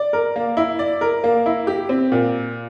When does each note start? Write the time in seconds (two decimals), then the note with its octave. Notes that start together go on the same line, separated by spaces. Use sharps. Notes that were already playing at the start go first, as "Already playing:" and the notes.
Already playing: D5
0.13 A#4
0.36 A#3
0.57 E4
0.79 D5
1.01 A#4
1.24 A#3
1.46 E4
1.67 G4
1.89 C4
2.12 A#2